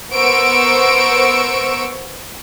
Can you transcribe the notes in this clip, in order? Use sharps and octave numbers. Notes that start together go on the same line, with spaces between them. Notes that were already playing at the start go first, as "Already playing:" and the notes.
B3 A#4 C5 C#6 E6 D7